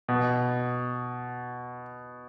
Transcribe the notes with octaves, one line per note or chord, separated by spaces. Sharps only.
B2